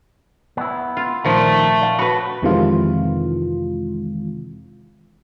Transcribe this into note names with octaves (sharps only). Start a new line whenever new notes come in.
B3 E4
F4
A#2 D#3 F3 A3
F5
F#4 B4 C#5 A5 B5
F2 C3 D#3 E3 G#3 F4